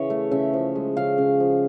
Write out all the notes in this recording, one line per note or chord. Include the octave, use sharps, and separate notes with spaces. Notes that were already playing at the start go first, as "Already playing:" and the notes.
Already playing: C#3 E3 C#5
A3
C#3 E5
F3
G#3
C#3 F5
C#3
F3